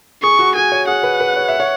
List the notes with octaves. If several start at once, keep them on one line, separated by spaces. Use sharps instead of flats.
G#4 C#6
F#4
G#4 G#5
C#5
G#4 F#5
B4
B4
C#5
E5
C#5